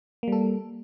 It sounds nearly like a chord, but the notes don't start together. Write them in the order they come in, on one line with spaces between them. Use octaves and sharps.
A#3 G3 A4